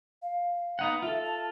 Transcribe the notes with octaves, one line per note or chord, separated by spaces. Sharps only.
F5
B3 D#4 F#5
F4 A4 E5
A5